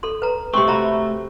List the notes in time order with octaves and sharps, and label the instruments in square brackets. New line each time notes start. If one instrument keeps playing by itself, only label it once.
[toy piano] A4 C6
B4 A#5
[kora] C3 C4 [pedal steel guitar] A3 [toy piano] C6 C#6
[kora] F#4 [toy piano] E5 A#5 B5